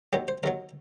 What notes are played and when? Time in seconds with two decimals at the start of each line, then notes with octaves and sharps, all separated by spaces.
0.13 D#2 D#3 F#3 G4
0.28 C5
0.43 D#2 D#3 F#3 A#4